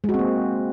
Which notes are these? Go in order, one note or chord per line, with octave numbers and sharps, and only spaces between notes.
G#3
F#4
C4
A#3